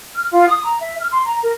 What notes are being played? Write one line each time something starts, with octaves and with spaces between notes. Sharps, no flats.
F6
F4
D#6
A#5
E5
F6
C6
A#5
A#4